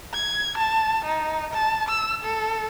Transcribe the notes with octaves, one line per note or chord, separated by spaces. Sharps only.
G#6
A5
D#4
A5
E6
A4